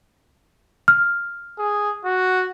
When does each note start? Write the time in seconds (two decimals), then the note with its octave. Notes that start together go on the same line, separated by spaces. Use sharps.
0.88 F6
1.58 G#4
2.05 F#4